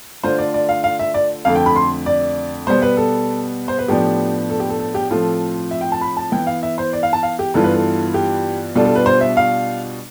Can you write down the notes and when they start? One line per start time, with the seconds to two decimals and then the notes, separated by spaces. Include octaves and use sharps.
0.23 D3 A3 D4 F4 C5
0.39 D5
0.54 D5
0.69 F5
0.84 F5
0.99 E5
1.14 D5
1.45 F2 D3 A3 F5
1.55 G5
1.66 B5
1.76 C6
2.06 D5
2.67 B2 G3 B3 C5
2.82 B4
2.97 A4
3.68 C5
3.78 B4
3.88 A2 F3 B3 D4 G4
4.50 A4
4.60 G4
4.70 A4
4.80 A4
4.95 G4
5.10 A2 F3 C4 F4 A4
5.71 E5
5.81 G5
5.92 A5
6.01 B5
6.17 A5
6.31 E3 B3 E4 G5
6.47 F5
6.63 E5
6.78 C5
6.93 D5
7.03 F5
7.13 A5
7.23 F5
7.39 G4
7.54 G2 E3 B3 F4 A4
7.64 B4
7.74 A4
8.14 G4
8.75 B2 G3 D4 F4 A4
8.85 A4
8.95 B4
9.06 C5
9.21 E5
9.37 F5